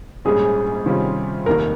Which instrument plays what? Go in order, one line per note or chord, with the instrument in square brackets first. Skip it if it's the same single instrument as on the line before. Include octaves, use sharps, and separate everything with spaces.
[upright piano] A#1 G#2 G3 C#4 [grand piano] G#4
[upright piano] C3 D#3 G3 C#4 F4
[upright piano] F1 D#2 D#3 [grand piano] A#4